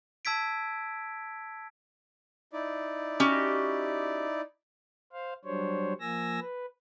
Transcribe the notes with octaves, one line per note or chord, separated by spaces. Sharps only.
A5 E6 G#6 B6 D7
D#4 E4 D5
C#4 F#4 G4
C5 F5
F#3 G3 D4 C5 C#5
F3 A#3 G#5 E6 A#6
B4